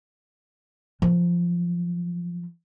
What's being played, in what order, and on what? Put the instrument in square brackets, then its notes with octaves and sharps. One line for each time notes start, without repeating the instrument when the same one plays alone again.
[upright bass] F3 F#3